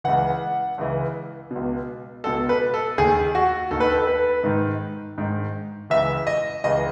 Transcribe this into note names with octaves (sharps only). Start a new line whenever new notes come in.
C#2 C#3 E3 F#5
C#2 C#3 E3
C#2 B2
C#2 B2 A4
B4
A4
D#2 D#3 G#4
F#4
D#2 D#3 A4
B4
A4
B4
G#2 D#3
G#2 D#3
C#2 C#3 E3 E5
D#5
C#2 C#3 E3 D#5